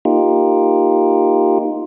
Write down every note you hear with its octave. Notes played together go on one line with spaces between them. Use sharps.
A#3 D#4 F4 G4